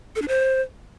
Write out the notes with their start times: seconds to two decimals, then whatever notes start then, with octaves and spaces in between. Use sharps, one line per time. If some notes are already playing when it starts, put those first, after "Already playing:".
0.16 A4
0.22 D4
0.28 C5